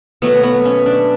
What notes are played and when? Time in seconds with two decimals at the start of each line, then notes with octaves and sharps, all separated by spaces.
0.22 B2 F#3 A3 B3
0.43 B3
0.65 C#4
0.86 D4